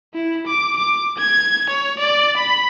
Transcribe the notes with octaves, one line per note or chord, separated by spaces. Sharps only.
E4
D6
D6
G#6
C#5
D5
B5